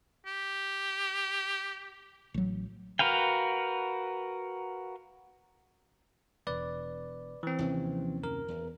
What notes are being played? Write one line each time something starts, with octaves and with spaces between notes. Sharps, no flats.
G4
A1 F#3
F#4 A#4 B4 F5 G5
E1 B4 D5
E3 C4
D#2 C3 F3 C#4
F#2 A#4
E2